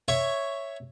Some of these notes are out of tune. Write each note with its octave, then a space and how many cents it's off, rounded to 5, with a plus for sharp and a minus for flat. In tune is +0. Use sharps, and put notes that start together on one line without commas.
C#5 +0 E5 +5